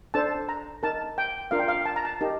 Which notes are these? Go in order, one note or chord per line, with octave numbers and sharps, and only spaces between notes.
D4 A4 C5 A5
A#5
D#4 A#4 A5
G5
D4 F4 A#4 F5
G5
F5
A5
A#5
A5
D#4 G4 A#4